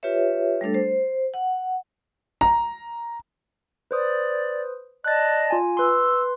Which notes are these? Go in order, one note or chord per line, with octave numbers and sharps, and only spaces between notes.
F4 G4 B4 C#5 E5
G3 A3 D4 A4
C5
F#5
A#5
B4 C5 D5 D#6
D5 D#5 A5 F#6 A6
F4 G#5
B4 C6 E6